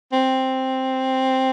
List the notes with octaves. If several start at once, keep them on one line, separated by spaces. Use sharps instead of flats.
C4